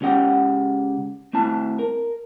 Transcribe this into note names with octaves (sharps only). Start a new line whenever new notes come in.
C#2 C#4 G4 F#5 G5
A3 C4 E4 A5
A#4